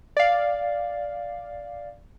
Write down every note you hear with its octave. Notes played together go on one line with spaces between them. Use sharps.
D5 F5